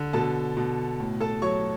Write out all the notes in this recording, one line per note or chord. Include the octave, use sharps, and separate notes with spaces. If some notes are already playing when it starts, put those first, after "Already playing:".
Already playing: D3
B2 A4 A5
B2
A2
A4 A5
F#3 C#5 C#6